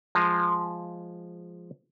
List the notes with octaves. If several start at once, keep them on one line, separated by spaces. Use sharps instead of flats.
F3 G#3